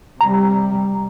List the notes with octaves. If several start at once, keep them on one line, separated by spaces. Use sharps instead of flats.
C3 G3 A#5